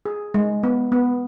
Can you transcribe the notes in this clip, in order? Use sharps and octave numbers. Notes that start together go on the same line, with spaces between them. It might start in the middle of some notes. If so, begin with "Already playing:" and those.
G#4
G#3
B3
B3